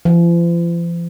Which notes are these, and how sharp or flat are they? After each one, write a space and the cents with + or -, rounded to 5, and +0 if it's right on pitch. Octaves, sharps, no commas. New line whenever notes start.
F3 -45